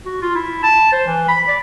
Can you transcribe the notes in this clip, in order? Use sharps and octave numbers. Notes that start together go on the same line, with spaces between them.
F#4
F4
E4
A5
C5
E3
B5
D5